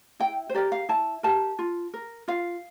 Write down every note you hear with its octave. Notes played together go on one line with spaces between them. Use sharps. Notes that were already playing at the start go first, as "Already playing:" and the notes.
E4 G5
C5
G4 A#4 D5
F5
E4 A5
G4 A#4 A5
F4
A#4
F4 F5